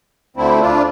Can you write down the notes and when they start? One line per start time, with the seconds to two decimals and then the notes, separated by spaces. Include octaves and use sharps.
0.36 D2 D3 A3 C4 E4
0.61 D4 F4